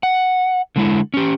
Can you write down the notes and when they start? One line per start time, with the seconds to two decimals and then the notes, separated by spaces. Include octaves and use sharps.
0.03 F#5
0.76 D3 G#3 E4
1.14 C#4 G4